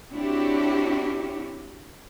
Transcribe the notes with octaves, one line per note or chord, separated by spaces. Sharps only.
C4 D4 E4 F#4 G4 C#5